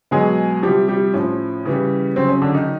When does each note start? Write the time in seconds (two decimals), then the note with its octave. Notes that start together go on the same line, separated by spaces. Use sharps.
0.11 B2 F#3 G#3 G#4
0.63 C3 F3 G3 G4
0.88 G3 G4
1.14 A2 F3 C#4
1.65 C#3 E3 G3
2.16 C#3 F#3 C4
2.29 C#4
2.42 D3 D4
2.55 D#3 D#4